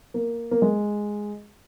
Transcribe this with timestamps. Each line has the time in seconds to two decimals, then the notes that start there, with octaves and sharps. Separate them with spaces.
0.14 A#3
0.51 A#3
0.62 G#3